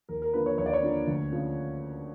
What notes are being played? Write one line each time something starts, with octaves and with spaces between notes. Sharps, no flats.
D#2 A#4
A#4
D3 F3 A#3 B4
C#5
D#2 C#5
D5
C#5
D3 F3 A#3
D2
C#3 F3